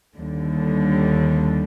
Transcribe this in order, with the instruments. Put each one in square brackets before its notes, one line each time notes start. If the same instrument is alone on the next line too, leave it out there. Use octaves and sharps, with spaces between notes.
[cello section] D#2 D3 G3